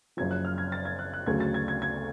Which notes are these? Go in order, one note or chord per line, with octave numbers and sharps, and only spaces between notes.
F#1 F#2 C#3 F3 G#6
F#6
F6
G#6
A6
G#6
F#6
F#6
D2 C#3 F#3 A3 G#6
A6
G#6
G#6
G#6